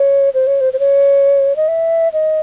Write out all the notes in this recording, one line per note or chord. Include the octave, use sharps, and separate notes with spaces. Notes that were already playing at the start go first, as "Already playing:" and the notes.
Already playing: C#5
C5
C#5
C5
C5
C#5
D#5
E5
D#5